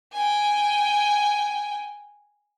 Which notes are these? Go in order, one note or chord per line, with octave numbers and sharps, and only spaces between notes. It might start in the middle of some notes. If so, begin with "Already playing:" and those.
G5 G#5